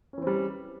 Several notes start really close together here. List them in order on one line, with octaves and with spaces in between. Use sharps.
C#4 E3 C4 G3